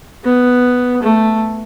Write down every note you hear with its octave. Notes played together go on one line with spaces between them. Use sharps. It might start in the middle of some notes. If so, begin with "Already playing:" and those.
B3
A3